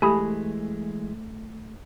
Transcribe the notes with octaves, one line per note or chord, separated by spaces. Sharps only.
E3 G#3 A3 G4 G#5 B5 D#6